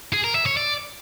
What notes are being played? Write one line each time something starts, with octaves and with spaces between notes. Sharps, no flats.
G#4
A#4
E5
C#5
D5